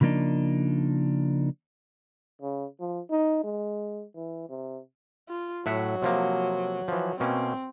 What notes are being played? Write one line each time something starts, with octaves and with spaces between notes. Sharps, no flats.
C#3 F3 A#3 D4 D#4
C#3
F3
D#4
G#3
E3
C3
F4
A2 F#3 E5 F#5
C3 F3 A#3
E3 F3
B2 A#3 C4 C#4